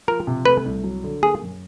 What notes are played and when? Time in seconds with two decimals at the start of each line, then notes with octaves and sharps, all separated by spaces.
0.08 F3 A#4
0.27 C3
0.45 A3 B4
0.65 C2
0.84 F#3
1.04 D3
1.22 A#3 G#4
1.42 F#2